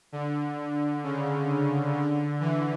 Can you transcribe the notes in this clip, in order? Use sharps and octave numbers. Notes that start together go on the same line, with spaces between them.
D3
C#3
D3
D3 E3